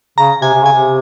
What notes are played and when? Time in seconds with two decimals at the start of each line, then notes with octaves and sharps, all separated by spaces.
0.18 C#3 A#5
0.41 C3 G#5
0.54 C3
0.63 C#3 G#5
0.72 C3